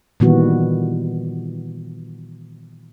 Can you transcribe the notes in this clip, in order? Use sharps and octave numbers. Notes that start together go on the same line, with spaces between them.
A#2 D#3 E3 G3 B3 F#4